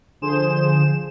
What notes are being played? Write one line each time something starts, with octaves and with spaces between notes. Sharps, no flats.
D3 F3 G#4 C5 E7